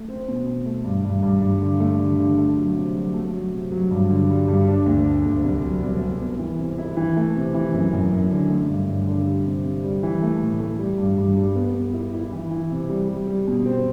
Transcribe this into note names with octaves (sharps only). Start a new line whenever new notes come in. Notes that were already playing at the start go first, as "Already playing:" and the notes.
Already playing: A3
C4
B2
B2
A3
G2
G2
G2
G2
D3
A3
D3
D3
A3
F#3
C3
F#3
A3
F#3
C3
F#3
G2
D3
G3
G2
D4
D2
D4
D2
C2
F#3
C2
C2
B3
E3
C3
E4
E3
A3
C3
E3
F#2
F#2
F#2
D3
A3
G2
G2
D3
G3
C3
C3
G3
E3
A3
A2
A3
G3
G2
G2
G3
B3
B3
E4
E4
E3
E3
C3
G3
G3
G3
B2
C4